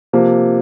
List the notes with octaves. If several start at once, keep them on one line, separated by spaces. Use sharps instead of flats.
C3 F3 A#3